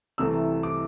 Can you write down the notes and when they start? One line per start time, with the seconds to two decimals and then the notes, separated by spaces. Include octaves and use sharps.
0.18 C2 C3 E3 A3 C4 E6
0.63 D6